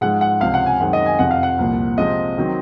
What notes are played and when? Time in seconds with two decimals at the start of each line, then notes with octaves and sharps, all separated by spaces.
0.01 G#2 F3 G#3 F#5
0.21 F#5
0.40 C#2 C3 F3 F5
0.54 F#5
0.66 G#5
0.80 F#2 D#3 G#3 C4 F#5
0.93 D#5
1.06 G#5
1.19 F2 C3 F3 F#5
1.31 F5
1.43 F#5
1.58 C2 A#2 F3 A#3
1.98 C3 F3 G#3 C4 D#5
2.38 D#3 F#3 C4